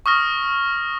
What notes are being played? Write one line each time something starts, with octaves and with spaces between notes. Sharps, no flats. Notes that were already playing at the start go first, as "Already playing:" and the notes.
C#6 D#6 F6 A#6